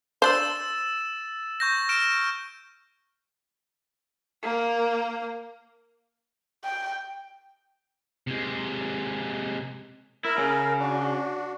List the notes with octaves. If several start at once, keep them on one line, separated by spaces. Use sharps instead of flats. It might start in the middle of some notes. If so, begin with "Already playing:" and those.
D4 C5 E6 A6 E7
C#6 G6 A#6
F6 D7 E7
A#3 A#4
G5
C3 G#3
E4 A#4
C#3
D4 F#4